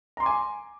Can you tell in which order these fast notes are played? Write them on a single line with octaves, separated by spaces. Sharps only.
A#5 C6 D6 G#5